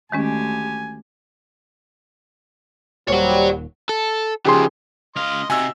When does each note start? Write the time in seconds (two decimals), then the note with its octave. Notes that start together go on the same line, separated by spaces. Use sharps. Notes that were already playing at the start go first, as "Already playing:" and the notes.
0.12 D2 D#3 G#3 C#4 G4 G#5
3.08 D#1 D#2 G3 C5 C#5 F#5
3.89 A4
4.45 C#3 F3 G4 G#4 C6
5.16 C#2 D#5 F5 C6
5.50 C3 D#4 F#4 G#5 E6